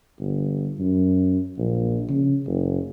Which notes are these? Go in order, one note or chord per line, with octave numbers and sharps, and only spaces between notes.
G1
F#2
A#1
C#3
F#1